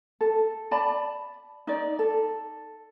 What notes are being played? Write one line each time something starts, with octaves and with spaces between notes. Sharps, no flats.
A4
D5 A5 B5
D#4 D5
A4